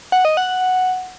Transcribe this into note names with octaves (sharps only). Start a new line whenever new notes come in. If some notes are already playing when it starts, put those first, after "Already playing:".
F#5
D#5
F#5